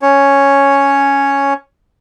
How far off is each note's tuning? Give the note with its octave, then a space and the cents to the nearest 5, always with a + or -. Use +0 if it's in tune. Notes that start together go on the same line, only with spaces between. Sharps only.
C#4 +0 C#5 +0